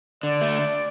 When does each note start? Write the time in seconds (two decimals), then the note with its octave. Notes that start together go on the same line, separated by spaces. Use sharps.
0.22 D3 D5
0.41 A3